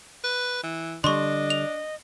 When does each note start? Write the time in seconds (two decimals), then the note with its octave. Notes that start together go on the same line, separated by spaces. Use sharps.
0.24 B4
0.63 E3
1.04 D3 G3 D4 D#5 C6 C#6
1.50 F7